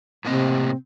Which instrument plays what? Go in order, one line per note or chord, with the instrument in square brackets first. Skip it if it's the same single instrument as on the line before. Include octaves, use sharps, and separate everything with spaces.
[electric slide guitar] A2 A#3 D#5 [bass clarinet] C3 [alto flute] C4